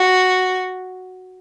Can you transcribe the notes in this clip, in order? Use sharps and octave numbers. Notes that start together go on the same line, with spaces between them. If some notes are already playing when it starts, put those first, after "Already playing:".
Already playing: F#4